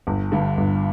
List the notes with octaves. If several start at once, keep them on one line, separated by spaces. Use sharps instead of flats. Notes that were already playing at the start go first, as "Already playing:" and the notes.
G1
G2 D3
G1